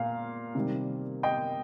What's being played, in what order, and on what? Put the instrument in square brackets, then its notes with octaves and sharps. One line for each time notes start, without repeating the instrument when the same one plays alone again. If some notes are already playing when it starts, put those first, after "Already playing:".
Already playing: [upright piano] A#2 F5
C3 D#3 G3
D#5 G5